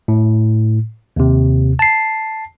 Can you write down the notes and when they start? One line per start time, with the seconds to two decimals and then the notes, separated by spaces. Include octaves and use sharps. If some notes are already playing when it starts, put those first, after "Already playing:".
0.08 A2
1.16 D#2 C3
1.79 A5 C7